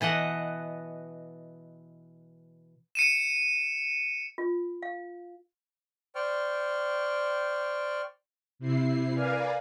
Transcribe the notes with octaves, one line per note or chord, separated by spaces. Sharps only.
B2 E3 D#5 F#5
C#7 D#7 E7
F4
F5
C5 D5 G5 C#6 F6
C3 E4 C7
A#4 B4 D5 F5 G#5